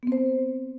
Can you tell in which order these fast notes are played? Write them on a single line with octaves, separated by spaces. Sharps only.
B3 C4 C5